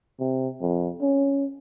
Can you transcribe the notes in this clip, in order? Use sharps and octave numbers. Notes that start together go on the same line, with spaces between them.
C3
F2
C#4